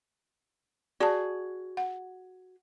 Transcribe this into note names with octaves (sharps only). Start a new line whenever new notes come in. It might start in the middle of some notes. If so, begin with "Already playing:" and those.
F#4 G#4 D5 A5
F#5